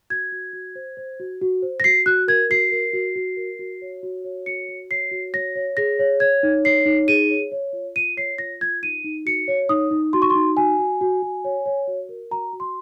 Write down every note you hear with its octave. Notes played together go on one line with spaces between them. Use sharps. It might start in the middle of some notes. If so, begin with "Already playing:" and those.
F#4 G#6
F#4
F#4
C5
C5
F#4
F#4
C5
A#6
F#4 C7
F#4 F#6
A#4 G#6
F#4 C7
A#4
F#4
F#4
A#4
F#4
C#5
F#4
C#5
F#4 C#7
F#4
C#5 C7
F#4
C#5 A#6
C#5
G#4 A#6
C#5
C#5 G#6
D#4
C#5 C7
D#4
G#4 D#7
C#5
C#5
F4
F4 D#7
C#5 C7
F4 A#6
F4 G#6
D#4 D#7
D#4
F#4 C#7
C#5
D#4 D#6
D#4
F#4 C6
C#6
C6
D#4
F#4 G#5
F#4
F#4
F#4
C#5
C#5
F#4
A#4
F#4 A#5
F#4
C6